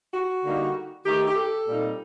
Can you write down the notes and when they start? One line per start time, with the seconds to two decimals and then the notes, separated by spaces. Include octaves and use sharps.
0.14 F#4
0.45 D3 G3 A#3 D#4
1.06 D#3 A3 D#4 G4
1.27 G4
1.36 A4
1.67 A#2 G3 C4 D#4